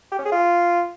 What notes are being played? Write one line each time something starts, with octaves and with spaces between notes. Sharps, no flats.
G4
C#4
G#4
F4